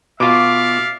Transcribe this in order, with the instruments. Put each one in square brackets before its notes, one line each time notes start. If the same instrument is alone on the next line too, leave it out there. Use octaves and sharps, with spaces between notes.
[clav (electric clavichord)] B2 F4 [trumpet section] D5 E5 F5 [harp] D6